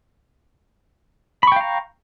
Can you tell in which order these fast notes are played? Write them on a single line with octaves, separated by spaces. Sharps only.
B5 C#6 G5 F5 A#5